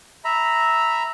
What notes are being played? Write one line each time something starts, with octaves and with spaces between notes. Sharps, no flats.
E5 A#5 B5